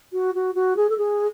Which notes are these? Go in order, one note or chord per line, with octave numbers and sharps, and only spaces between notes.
F#4
F#4
F#4
G#4
A4
G#4